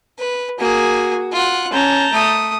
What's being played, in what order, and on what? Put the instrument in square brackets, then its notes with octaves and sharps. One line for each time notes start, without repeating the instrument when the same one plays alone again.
[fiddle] B4
[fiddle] A#3 G#4 [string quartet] F#4
[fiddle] F4 F#5
[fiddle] C#4 [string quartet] A5 A#5 G6
[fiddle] A3 D#6